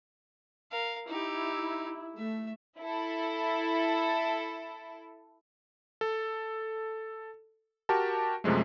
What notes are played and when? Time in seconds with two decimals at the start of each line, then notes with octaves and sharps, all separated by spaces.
0.71 A#4 F5
1.08 D#4 E4 G4
2.17 A3 E5
2.79 E4 A4
6.01 A4
7.89 F#4 G4 A#4 A5
8.44 F#2 C3 F3 G#3 A3